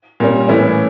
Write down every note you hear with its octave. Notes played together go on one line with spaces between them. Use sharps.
A#2 G3 A#3 C#4
A2 E3 A3 C#4 E4